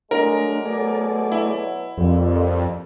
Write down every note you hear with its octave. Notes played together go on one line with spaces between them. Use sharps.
F#3 G#3 A3 D4 A#4
B2 F#3 A3 G#4 D5
E4
F2 G3 A#3 C4